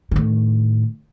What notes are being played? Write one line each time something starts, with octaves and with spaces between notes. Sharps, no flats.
A2 D#3